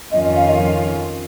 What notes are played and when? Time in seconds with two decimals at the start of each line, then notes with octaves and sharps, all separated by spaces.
0.11 F2 D#3 C#4 F4 D#5
0.23 D#5
0.35 F5
0.49 D#5